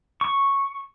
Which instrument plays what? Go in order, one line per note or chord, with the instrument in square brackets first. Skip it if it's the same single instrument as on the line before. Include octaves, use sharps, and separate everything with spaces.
[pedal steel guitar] C#6